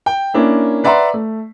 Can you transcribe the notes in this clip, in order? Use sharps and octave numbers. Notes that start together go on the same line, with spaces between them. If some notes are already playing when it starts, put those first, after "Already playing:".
G5
A#3 C#4 D4 E4
B4 D5 E5 F#5 A#5 C6
A3